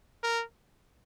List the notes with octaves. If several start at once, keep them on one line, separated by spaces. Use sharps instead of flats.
A#4